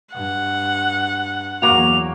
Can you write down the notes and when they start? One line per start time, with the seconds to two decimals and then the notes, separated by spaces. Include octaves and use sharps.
0.14 G2 F#5
1.62 E2 F#3 A#3 F#4 F7